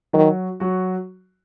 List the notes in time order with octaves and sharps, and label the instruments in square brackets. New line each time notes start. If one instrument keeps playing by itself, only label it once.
[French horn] D#3 [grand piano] F#3 F#4
[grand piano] F#3 F#4